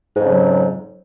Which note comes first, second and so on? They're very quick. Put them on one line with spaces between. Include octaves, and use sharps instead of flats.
G#2 F2 C#3 F#3